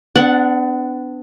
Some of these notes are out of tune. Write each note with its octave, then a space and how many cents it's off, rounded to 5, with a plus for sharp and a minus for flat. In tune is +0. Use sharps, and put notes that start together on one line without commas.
B3 +40 D4 +0 F#5 +0